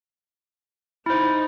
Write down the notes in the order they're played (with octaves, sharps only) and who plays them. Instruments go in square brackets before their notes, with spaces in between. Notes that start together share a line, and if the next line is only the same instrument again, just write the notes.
[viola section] D#4 [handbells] E4 C5